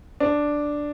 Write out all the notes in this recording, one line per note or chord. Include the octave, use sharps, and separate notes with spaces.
D4